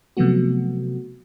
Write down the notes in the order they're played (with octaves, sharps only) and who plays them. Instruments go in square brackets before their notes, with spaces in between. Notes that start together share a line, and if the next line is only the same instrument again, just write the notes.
[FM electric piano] C3 F3 F#3 A3 B3 F#4